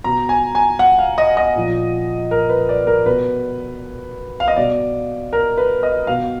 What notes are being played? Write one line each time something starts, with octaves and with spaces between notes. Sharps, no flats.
B2 A#5
G#5
G#5
F#5
F5
D#5
D#5
A#2 F3
A#4
B4
D5
A#4
B2 B4
F5
D#5
B2 D5
A#4
B4
D#5
B2 F5